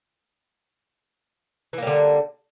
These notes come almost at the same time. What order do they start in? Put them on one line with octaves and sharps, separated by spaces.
E3 A#3 G3 D3